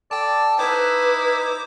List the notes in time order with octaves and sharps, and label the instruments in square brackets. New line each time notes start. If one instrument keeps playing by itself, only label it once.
[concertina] A4 [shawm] D5 [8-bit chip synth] G5 A5
[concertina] D#4 D#5 A#5 [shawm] E4 [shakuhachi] B4 [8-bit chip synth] C5 D6